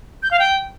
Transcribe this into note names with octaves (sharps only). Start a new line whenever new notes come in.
G6
F5
G5